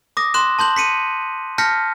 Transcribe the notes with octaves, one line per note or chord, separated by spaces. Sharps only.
D6 D#6 A#6
C6 F#6 E7
A5 C6 G6 F#7
B6 C#7 D#7
A5 F6 G6 A#6 B6 C#7